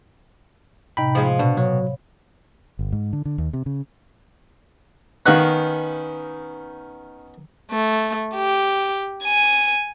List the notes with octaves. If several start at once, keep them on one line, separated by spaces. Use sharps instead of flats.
A2 C3 D#4 G5 B5
F3 G#3
B2 D4
F#3 C#5
G1
G#2
D3
D3
D#2
C3
C#3
D#3 B3 C#4 D#4 F5 F#6
A3
G4
G#5